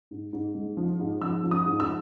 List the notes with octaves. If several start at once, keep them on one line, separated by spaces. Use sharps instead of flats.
G#2
G#2
G#3
F3
G#2
F3 E6
F3
D#6
G#2
E6